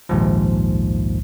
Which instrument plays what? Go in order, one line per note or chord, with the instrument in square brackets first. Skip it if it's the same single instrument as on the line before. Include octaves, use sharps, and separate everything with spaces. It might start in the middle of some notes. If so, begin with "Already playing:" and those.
[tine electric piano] A#1 D#2 G#2 F3